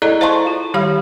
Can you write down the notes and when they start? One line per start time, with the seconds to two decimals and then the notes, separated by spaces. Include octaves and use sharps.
0.02 E4 G#4 A4 D5 D#5 A#5
0.21 C5 F5 A5 A#5 C6 C#6
0.47 F4
0.74 D#3 G3 G4 F5 B5